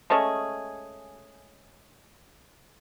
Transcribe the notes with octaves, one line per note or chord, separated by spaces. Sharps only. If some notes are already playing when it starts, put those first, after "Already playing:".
G#3 A3 C#4 G#4